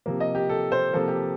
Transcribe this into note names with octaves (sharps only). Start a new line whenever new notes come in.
C3 F3 A#3
D#5
G4
A4
C5
C3 F3 A#3 A4
G4